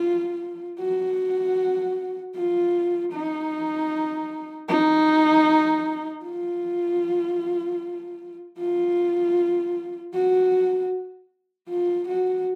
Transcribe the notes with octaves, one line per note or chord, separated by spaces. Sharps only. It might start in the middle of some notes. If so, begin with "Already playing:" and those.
Already playing: F4
F#4
F4
D#4
D#4
F4
F4
F#4
F4
F#4